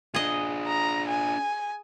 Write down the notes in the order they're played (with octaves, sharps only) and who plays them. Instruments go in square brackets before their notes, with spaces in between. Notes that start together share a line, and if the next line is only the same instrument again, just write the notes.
[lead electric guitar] D4 F4 [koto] G#4 D#5
[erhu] A#5
G#5